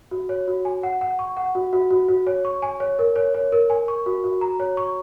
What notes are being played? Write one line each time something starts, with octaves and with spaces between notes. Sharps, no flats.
F#4
C#5
F#4
G#5
F#5
F#5
C#6
F#5
F#4
F#4
F#4
F#4
C#5
C#6
G#5
C#5
A#4
C#5
C#5
A#4
G#5
C#6
F#4
F#4
A#5
C#5
C#6